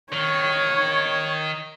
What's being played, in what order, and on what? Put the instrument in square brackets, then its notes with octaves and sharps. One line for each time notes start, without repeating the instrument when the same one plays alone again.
[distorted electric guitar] D#3 [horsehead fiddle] C#5